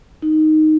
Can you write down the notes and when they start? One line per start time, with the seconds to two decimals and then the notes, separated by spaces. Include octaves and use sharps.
0.22 D#4